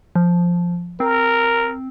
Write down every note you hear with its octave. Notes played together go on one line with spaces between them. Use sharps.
F3
C4 A#4